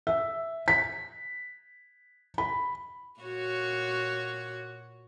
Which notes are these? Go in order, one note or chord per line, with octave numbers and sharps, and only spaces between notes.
E5
B6
B5
A#2 F#4 C#5